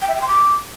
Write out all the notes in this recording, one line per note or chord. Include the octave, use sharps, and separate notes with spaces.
G5
E5
G5
C6
D6